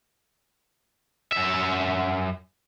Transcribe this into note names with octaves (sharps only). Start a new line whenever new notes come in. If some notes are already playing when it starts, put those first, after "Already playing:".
F#2 E5